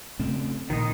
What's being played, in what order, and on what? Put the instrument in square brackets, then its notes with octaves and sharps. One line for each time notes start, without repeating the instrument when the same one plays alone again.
[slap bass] C#3 A3 C4
[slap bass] A#1 [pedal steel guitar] D#3 D#4